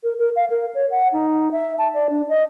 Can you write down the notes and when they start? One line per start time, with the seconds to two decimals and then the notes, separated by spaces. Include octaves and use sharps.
0.03 A#4
0.18 A#4
0.36 F5
0.50 A#4
0.75 C#5
0.91 F#5
1.13 D#4
1.52 E5
1.78 A5
1.94 D5
2.10 D4
2.29 D#5